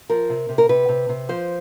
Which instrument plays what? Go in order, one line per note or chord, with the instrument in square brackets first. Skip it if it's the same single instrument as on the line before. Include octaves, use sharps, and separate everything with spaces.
[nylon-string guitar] F3 A#4
C3
C3
A#4
C3 B4
C3
C3
F3 C5